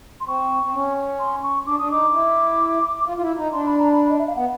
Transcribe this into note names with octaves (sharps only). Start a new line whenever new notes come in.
C6
C4 C#6
C4
C#4
C6
C#6
D4 D6
D4 D#6
D#4 D6
E4
F4
F4
E4
D#4
D4 C6
B5
A#5
B5
D#5
E5
F5
B3 F#5